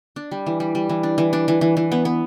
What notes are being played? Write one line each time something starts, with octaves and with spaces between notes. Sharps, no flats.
D4
G3
E3
G3
G3
E3
D4
E3
D4
E3
E3
E3
B3
B3